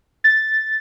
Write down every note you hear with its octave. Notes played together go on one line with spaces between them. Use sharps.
A6